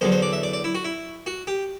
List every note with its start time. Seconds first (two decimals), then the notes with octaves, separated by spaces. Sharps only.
0.01 E2 D3 F#3 C5
0.12 C5
0.22 D5
0.33 E5
0.43 D5
0.53 D5
0.64 E4
0.75 F#4
0.84 E4
1.26 F#4
1.47 G4